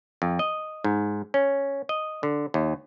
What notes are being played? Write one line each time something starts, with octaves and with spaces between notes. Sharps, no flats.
F2
D#5
G#2
C#4
D#5
D3
D#2